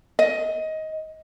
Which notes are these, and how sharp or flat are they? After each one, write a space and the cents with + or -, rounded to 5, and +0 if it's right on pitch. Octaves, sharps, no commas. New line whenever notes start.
D#5 +15